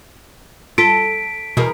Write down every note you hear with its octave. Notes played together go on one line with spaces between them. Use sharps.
F4 A4 B6 D7
E2 B2 G#4 A#4